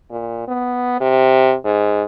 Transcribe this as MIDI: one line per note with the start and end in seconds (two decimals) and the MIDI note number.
0.11 0.44 46
0.48 0.98 59
1.00 1.54 48
1.65 2.03 44